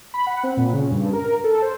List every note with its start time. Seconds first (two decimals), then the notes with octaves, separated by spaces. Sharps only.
0.14 B5
0.27 F#5
0.43 C4
0.57 A#2
0.73 C#3
0.91 G2
1.13 A#4
1.44 A4
1.62 C5